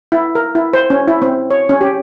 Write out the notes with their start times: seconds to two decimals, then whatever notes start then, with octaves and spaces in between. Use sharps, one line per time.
0.12 E4
0.35 A#4
0.55 E4
0.74 C5
0.90 C#4
1.08 E4
1.22 C4
1.50 C#5
1.69 C#4
1.81 G4